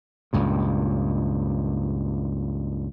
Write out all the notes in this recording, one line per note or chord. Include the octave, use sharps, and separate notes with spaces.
C#2 G2 A#2